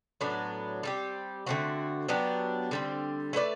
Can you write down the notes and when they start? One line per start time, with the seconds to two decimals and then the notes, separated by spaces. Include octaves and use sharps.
0.21 A2 F#3 B3 D4
0.83 G3 C4 G4
1.46 D3 A3 C4 F#4
2.08 F#3 B3 D4 G4
2.71 D3 G3 C4
3.33 A3 E4 B4 D5